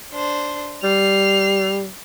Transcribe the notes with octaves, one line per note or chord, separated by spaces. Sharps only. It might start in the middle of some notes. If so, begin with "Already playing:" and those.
D4 C5
G3 C7 F7